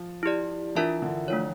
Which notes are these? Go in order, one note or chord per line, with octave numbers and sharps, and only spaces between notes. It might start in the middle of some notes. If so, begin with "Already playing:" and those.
Already playing: F3
E4 G4 D5
E3 D4 F4 A#4 E5 A5
D3
F3 A3 D4 F4 C#5